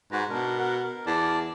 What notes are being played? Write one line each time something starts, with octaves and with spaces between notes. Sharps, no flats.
G#2 F#4 B4 A#5
B2 D4 A#4
A#4 F#5
A#4
E2 D5 A5